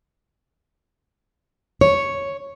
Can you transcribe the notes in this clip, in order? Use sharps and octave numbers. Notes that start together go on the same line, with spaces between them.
C#5